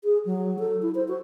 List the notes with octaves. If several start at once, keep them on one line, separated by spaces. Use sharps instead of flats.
G#4
F#3
A4
E4
C5
F#4